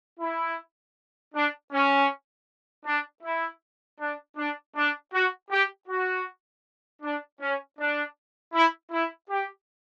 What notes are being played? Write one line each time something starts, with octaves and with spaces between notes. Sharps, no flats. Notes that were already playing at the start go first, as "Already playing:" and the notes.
E4
D4
C#4
D4
E4
D4
D4
D4
F#4
G4
F#4
D4
C#4
D4
E4
E4
G4